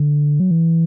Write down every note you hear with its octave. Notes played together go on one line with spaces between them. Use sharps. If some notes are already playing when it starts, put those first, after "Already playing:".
Already playing: D3
F#3
E3